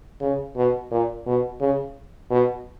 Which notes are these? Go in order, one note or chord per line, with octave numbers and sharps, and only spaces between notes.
C#3
B2
A#2
B2
C#3
B2